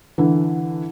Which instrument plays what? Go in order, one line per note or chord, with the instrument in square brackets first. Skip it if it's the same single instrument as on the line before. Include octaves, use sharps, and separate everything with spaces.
[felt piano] D3 E3